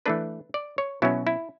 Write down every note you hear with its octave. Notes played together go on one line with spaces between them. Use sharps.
E3 A3 D4 B4
D5
C#5
B2 F#3 C#4 E4
E4